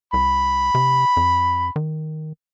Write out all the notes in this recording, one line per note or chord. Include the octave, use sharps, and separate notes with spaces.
C2 B5
C3
F2
D#3